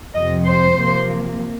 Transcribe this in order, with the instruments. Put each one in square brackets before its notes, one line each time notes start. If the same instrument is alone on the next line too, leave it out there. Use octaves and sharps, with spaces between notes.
[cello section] F2 C3 F3 D#5
C5
C3 F3 A#3